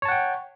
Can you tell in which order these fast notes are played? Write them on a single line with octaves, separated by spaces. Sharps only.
C#5 A5 F#5 G5